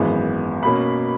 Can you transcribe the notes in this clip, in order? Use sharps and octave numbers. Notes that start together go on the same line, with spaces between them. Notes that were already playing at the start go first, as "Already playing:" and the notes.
Already playing: G#1 F#2 E3 G#3 B3
B2 A#3 C#4 B5